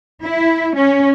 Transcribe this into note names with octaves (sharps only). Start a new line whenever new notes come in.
E4
C#4